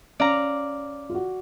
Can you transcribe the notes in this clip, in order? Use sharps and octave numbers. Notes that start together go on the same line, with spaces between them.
C#4 D5 F5 A#5
F4
F#4